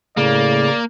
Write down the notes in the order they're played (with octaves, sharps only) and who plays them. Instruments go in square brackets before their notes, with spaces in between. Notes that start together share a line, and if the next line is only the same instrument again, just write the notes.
[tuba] A2 [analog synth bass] C#3 [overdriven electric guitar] A#3 [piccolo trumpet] D5